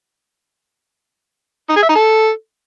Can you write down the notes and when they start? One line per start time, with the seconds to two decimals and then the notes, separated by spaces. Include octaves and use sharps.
1.70 D#4
1.76 G#4
1.83 E5
1.89 D#4
1.96 A4